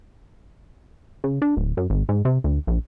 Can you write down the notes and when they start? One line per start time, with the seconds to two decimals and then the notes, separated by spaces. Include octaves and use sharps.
1.24 C#3
1.42 D4
1.57 D1
1.77 F#2
1.90 G#1
2.09 G#2
2.25 C3
2.44 D2
2.67 A#1